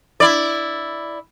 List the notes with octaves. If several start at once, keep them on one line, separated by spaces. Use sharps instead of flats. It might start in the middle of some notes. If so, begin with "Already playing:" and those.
E4 D5